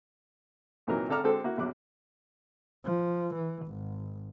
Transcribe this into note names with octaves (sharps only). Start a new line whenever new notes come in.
C2 A#2 E3 F#3 D#4 A#4
G#1 D3 A4 D5 A#5 F6
D3 G#3 C4 F#4 A4
A#3 E4 F#4
A#1 E2 F#3 D6 F#6
F3
E3
G#1